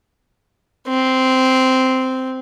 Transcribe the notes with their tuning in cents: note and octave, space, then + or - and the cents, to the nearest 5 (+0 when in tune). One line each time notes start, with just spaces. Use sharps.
C4 -10